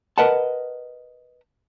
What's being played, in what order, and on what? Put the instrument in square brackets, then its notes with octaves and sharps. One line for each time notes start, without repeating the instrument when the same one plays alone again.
[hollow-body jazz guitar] A#4 B4 D#5 F#5 A5